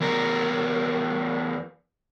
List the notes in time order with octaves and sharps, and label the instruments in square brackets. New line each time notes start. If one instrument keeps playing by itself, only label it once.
[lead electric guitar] E2 A#4